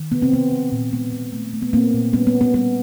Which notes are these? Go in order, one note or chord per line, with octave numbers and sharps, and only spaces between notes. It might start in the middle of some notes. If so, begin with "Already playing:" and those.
Already playing: D#3
C3 B3
C4
C3 B3
F3
A#2
G#3 B3
A#2
A3
A3
B3
A#2 A#3 C4
A#2
G3 B3 C#4
B3
G3
B3
G3 B3